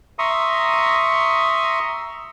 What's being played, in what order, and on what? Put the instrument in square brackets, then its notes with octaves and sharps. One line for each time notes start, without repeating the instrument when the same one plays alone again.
[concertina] E5 A#5 C6 C#6 D#6